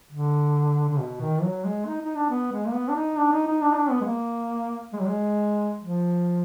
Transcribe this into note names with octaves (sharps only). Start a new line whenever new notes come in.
D3
D3
B2
D#3
F#3
G#3
D#4
D#4
D4
B3
G#3
A#3
B3
D4
D#4
D4
D#4
D#4
D4
D#4
D4
B3
G#3
A#3
G#3
F#3
G#3
F3